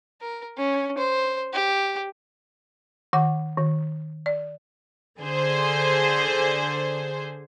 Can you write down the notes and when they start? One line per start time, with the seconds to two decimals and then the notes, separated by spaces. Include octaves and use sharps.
0.21 A#4
0.58 C#4
0.98 C5
1.53 G4
3.13 D#3 F#5 D6
3.58 D#3
4.26 D5
5.20 D3 G#4 C5